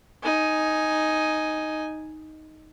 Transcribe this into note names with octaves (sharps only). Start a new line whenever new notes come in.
D#4 G#5